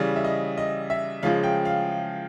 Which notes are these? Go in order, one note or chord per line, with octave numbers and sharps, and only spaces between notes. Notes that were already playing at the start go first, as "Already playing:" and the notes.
Already playing: C#3 E3 G3
E5
D#5
D#5
E5
C#3 F3 G#3 F5
G5
F5